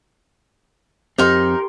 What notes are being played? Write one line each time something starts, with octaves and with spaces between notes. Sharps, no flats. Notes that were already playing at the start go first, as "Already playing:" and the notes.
F2 C4 D#4 G4 A#4 C6